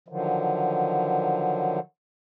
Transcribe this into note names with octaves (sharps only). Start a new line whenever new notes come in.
D3 D#3 F3 F#3